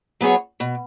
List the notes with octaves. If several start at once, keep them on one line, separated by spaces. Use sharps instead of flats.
F#3 B3 G#4 C#5
B2